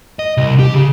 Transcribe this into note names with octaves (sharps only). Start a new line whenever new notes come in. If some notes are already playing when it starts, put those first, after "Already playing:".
D#5
C2
G4
C#3